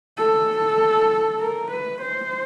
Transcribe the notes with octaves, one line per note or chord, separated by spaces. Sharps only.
A4
A#4
B4
C5